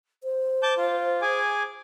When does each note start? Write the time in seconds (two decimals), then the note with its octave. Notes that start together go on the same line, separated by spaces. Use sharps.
0.24 C5
0.63 A5 D6 G6
0.77 F4
1.22 G#4 G#5 D6